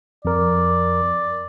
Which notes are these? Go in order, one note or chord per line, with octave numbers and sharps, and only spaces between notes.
F2 A#4 D5